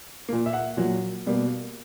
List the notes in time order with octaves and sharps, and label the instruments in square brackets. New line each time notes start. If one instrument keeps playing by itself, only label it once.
[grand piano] A#2 A#3
E5
F#5
A#2 F#3 A#3
B2 G3 A#3